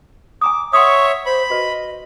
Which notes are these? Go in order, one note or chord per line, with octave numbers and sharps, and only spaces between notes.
G#5 A#5 D6 D#6
C#5 E5 F#5 C6 C#6 D#6
C5 B5
F#4 B4 D#5